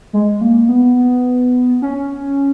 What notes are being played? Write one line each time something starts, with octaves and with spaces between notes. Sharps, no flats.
G#3
A#3
B3
C#4